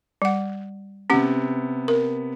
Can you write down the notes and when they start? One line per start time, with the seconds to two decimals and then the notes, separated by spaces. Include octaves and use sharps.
0.22 G3 F#5
1.10 C3 B3 C#4 G4 F#5
1.88 A#4